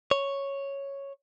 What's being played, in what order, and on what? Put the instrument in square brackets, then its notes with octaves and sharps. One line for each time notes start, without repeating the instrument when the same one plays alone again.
[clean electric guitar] C#5